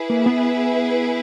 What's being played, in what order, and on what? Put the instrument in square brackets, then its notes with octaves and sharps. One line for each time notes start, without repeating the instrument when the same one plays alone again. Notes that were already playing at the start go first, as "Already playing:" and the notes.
Already playing: [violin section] E4 G#4 B4
[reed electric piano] A#3
B3